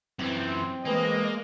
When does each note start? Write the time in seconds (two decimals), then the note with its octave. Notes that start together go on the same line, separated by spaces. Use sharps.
0.19 F#2 E3 C4
0.85 E3 G#3 A#3 D#5